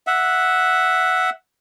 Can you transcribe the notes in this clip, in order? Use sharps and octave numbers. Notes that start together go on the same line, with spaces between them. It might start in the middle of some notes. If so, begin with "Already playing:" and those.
E5 F#5